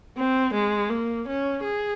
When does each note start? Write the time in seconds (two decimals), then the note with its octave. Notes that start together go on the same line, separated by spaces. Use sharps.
0.17 C4
0.54 G#3
0.90 A#3
1.27 C#4
1.64 G#4